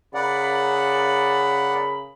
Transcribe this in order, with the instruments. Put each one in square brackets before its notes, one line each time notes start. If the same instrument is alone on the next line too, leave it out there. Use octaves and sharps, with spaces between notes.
[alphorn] C#3 [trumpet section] A#4 B5 [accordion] D5 F#5